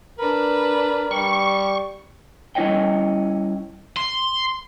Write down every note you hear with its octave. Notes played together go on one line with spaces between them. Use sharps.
D4 A#4 B4
G3 C#6
G3 C#4 E4 C#5 D#5 G5
C6